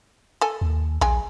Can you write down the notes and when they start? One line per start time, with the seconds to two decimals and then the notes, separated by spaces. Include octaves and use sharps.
0.41 A4 G#5
0.61 D#2
1.01 A#1 G#3 G5 G#5